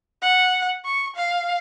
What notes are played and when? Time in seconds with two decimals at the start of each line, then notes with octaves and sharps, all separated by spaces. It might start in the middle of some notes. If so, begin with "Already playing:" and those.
0.22 F#5
0.85 C#6
1.16 F5